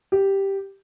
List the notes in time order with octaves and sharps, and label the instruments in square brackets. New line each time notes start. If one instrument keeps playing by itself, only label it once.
[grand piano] G4